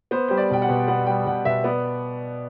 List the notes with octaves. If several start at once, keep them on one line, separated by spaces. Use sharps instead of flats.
B3 C5
G3 C5
D5
B2 G5
F#5
B2
B3 F#5
G3 G5
B2 F#5
B2 E5
B3 D5